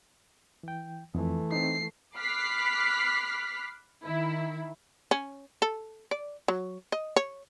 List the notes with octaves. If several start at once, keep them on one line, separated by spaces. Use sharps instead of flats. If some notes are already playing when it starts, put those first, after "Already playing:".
E3 G5
F2 E3 A3
C4 D#4 C7
B5 D6 F6 F#6 B6 C7
D#3 E4
C#4
A4
D5
F#3
D#5
C#5